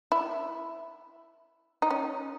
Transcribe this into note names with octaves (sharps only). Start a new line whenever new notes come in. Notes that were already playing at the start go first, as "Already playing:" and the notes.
E4
D#4
C#4